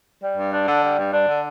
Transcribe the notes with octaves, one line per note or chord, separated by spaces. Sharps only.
G3
G2
D4
D3
G3
G2
D4
D3